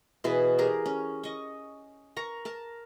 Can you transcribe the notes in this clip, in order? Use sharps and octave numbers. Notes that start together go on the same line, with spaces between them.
B2 E3 G#4 B4
G4 G#4 A#4
C#4
D#5 C#6
A#4 A#5 C#6
A#4 A5